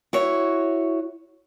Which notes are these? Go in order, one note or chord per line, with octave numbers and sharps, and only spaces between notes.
E4 F#4 C#5